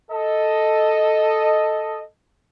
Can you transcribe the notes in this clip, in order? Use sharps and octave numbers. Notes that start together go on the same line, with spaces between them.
A4 D#5